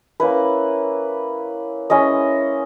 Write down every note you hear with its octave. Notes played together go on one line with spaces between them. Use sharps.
A#3 C#4 E4 B4
G#3 C#4 E4 D#5